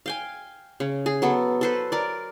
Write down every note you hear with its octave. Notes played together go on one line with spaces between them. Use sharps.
F5 G5 G#5
C#3
G#4
F#3 B3 A4
A4 B4 C5
A#4 D5